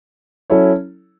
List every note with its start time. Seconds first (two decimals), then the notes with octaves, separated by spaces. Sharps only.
0.50 F#3 C#4 E4 A4 C#5